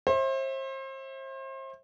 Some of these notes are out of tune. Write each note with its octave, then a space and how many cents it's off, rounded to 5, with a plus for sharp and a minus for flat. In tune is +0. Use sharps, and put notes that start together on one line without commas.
C5 +35 E5 -10